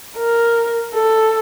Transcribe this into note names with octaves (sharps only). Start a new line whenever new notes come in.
A#4
A4